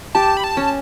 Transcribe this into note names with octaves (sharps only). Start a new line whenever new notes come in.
G4 A5
B5
A5
C#4